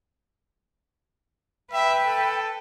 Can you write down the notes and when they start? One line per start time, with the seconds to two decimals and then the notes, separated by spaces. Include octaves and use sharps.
1.73 B4 E5 G5
2.06 A4